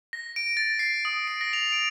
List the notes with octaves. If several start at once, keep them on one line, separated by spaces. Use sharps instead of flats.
A#6
D7
A6
C7
D#6
D7
A#6
F7
D7